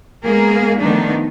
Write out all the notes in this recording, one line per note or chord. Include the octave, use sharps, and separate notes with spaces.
G#3 A#3 B3 G#4 A#4
D#3 F3 A3 B3 D4 D#4